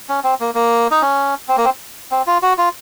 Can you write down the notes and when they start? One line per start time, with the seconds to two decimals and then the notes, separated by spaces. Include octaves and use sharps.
0.09 C#4
0.24 C4
0.40 A#3
0.55 A#3
0.91 D#4
1.02 C#4
1.48 C4
1.57 A#3
1.65 C4
2.11 C4
2.27 F4
2.42 F#4
2.58 F4